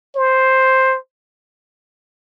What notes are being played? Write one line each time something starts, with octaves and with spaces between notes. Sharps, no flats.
C5